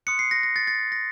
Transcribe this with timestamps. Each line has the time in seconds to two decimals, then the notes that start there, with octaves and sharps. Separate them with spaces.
0.07 C6 D#6 F#6 C#7
0.19 C7
0.31 A#6
0.43 A#6
0.56 A6
0.67 A6
0.92 A#6